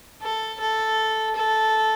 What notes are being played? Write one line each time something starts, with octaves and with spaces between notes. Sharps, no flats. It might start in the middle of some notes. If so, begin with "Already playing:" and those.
A4
A4
A4